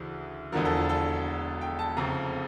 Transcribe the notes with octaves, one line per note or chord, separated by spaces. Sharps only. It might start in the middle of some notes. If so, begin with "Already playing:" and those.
Already playing: D2 C#3 E3
E1 E2 D3 F3 A#4
A4
F4
A4
G5
A5
F1 F2 C#3 A#5